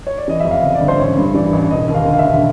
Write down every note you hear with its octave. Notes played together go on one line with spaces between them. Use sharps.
C#5
D5
E3 D#5
F2 E5
F5
C#3
D5
G1
C5
A1 C#5
G2
E3 D5
A1
E1 D#5
D#2
F5
D3
F5
E5
E1